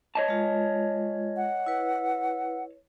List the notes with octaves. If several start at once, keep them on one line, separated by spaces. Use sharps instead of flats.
C#5 D#5 A5
G#3 F4
F#5
E4 B4